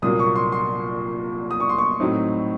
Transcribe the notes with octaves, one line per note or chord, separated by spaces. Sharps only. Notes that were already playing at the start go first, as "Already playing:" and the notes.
C2 A#2 F#3 A#3 D#6
C#6
C6
C6
D#6
C#6
C6
C#6
A2 F#3 C4 D#4